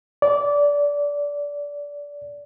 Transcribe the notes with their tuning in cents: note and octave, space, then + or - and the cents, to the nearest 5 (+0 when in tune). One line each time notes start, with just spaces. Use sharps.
D5 -20